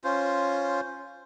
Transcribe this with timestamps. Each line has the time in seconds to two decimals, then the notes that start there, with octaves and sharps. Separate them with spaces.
0.04 C#4 F4 C5